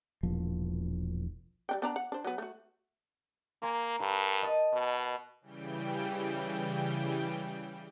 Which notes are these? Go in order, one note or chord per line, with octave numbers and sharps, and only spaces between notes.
E1 A#1 F3
G3 D4 G5
B3 D4 A#5
F#5
D4 C5
F#3 B3
A3 F#4
A#3 G#5 A#5 C6
G2 A#4
D#5 A5 D#7
B2
C#3 E3 G3 G5